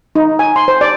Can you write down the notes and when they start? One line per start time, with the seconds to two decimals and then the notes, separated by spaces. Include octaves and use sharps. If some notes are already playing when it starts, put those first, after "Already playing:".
0.15 D#4
0.39 G#5
0.56 C6
0.68 C5
0.81 D5